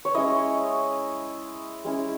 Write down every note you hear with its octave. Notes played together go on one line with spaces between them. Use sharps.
C#5
G#3 C#4 E4 D#5
G#3 C#4 E4